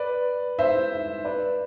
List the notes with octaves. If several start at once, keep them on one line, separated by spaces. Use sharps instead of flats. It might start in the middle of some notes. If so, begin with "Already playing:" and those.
Already playing: B4 D5
C5 E5
B4 D5